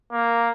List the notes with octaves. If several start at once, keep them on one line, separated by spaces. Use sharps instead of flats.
A#3